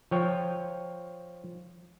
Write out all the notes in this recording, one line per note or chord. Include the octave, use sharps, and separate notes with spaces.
F3 C#5 G5